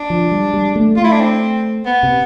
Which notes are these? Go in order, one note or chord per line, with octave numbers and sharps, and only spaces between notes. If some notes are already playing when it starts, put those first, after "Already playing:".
Already playing: D4
F3
G3
G3
A3
A3 F4
E4
D4
C4
B3
C3